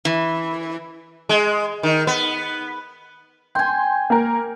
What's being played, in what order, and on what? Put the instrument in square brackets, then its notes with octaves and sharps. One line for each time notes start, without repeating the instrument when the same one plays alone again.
[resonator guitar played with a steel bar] E3
[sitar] G#3
D#3
B3
[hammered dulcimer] G5 G#5 [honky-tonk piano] C6
[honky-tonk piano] A#3 A#4